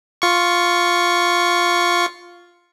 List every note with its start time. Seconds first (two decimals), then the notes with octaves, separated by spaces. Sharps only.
0.22 F4 C#6